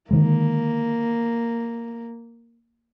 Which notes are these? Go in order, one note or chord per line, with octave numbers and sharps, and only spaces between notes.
D3 D#3 G#3 A#3